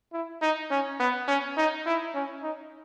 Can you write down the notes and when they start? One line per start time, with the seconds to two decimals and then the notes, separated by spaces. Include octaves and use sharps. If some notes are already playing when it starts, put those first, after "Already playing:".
0.13 E4
0.42 D#4
0.71 C#4
1.00 B3
1.28 C#4
1.57 D#4
1.86 E4
2.14 C#4
2.43 D#4